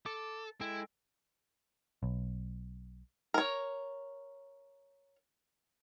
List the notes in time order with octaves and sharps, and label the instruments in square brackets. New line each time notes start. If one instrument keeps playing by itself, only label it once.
[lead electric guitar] A4 [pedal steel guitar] D6
[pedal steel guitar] G#3 A4 G5 [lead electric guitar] E4
[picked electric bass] B1
[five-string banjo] A#4 C#5